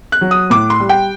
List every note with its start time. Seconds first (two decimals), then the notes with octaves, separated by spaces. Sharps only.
0.12 F#6
0.21 F#3
0.31 D#6
0.50 A2 D6
0.70 C6
0.80 G3
0.89 G5